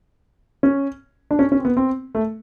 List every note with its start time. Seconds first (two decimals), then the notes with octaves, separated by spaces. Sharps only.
0.63 C#4
1.31 D4
1.39 C#4
1.52 C#4
1.59 C4
1.65 B3
1.77 C4
2.15 A3